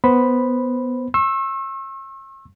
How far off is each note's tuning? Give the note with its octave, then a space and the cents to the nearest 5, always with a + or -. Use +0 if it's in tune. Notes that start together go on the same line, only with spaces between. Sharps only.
B3 +0 C5 +0 B5 +0
C#6 -45 E6 +0